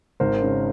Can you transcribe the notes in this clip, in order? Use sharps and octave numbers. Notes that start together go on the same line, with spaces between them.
G#1 A#4 C5
C#3